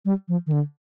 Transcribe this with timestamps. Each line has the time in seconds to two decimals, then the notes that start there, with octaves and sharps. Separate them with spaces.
0.05 G3
0.28 F3
0.47 D#3
0.52 D3